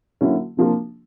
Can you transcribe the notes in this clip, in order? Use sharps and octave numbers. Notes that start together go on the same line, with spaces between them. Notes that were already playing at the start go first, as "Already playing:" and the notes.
D3 F#3 A#3 C#4 E4
C3 F3 A#3 D4 F4